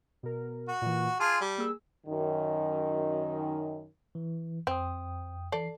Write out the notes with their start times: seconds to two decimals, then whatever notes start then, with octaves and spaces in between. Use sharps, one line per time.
0.23 B2 A#4
0.68 F#4
0.82 A#2 E3
1.20 F4 G#4 A5
1.41 G3
1.58 A#3 G#4 E6
2.06 F#2 D#3
4.15 E3
4.67 F2 C4 G5 D#6
5.52 E3 A4 D5 C7